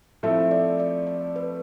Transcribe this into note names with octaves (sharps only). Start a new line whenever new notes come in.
F3 A3 C4 E4 A4 E5
D5
D5
D5
B4